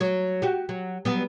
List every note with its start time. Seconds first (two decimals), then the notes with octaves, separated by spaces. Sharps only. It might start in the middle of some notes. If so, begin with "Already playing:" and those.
0.01 F#3
0.42 F#4 G4
0.69 F#3
1.05 F#3 G3 B3